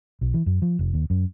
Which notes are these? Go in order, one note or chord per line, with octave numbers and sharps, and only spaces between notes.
B1
E3
F#2
F3
F1
D#2
F#2